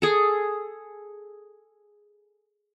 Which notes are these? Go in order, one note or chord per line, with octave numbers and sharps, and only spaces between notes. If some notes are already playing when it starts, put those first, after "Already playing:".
G#4 A4